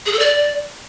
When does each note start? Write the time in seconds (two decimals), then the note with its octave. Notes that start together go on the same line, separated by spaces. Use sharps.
0.06 G#4
0.13 A4
0.19 D5